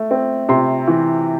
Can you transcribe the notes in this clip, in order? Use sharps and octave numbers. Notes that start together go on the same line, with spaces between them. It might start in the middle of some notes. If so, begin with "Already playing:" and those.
Already playing: A3
C4
C3 C6
E3